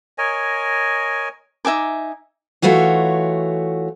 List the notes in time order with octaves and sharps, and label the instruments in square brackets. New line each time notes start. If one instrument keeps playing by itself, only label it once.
[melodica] A#4 C#5 D#5 G#5
[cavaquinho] D#4 E5 G#5 D6
[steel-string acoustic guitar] E3 A3 F4 F#4 C#5